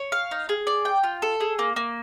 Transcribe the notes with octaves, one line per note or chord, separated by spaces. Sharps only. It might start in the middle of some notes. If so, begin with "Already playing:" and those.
Already playing: C#5
F5
D#4
G#4
D5
G5
F4
A4
G#4
A#3
A#3